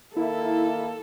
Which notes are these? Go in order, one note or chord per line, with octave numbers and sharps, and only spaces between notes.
D#3 A#3 E4 A4